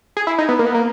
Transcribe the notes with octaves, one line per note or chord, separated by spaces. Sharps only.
G#4
E4
D#4
B3
A#3
B3
A#3